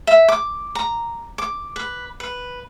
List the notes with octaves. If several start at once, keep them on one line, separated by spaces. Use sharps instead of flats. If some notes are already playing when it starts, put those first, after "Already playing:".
E5
D6
A#5
D6
B4
B4